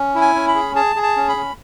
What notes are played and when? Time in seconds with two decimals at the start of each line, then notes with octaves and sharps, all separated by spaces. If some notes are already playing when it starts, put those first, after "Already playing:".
Already playing: C#4
0.15 E4
0.21 G#5
0.35 C#4
0.48 B5
0.55 G#4
0.75 G#4 A5
0.96 G#4
1.03 A5
1.16 C#4
1.29 B5
1.37 C#4